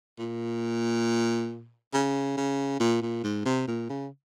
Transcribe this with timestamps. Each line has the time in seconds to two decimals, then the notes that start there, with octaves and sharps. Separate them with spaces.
0.19 A#2
1.94 C#3
2.37 C#3
2.80 A#2
3.02 A#2
3.24 G#2
3.45 C3
3.68 A#2
3.90 C#3